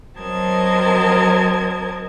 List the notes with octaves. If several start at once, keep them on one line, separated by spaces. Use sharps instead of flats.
F#3 C4 A#4 D#5 A5 G#6